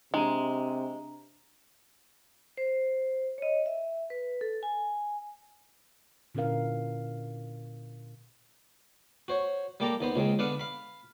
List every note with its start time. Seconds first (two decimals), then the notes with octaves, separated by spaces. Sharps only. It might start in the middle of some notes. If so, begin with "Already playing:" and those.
0.14 C3 G#3 D4 A#5 D#7
2.57 C5
3.38 C#5 D#5
3.66 E5
4.10 B4
4.41 A4
4.63 G#5
6.35 A#2 D3 C#4 E4 A#4 F5
9.28 F#4 C5 C#5
9.80 G3 A#3 G4 A4 A5 A#5
10.00 D#2 B3 C5
10.16 C#2 G#3 C4
10.39 D3 B3 D4 F5 F#5
10.59 F5 B5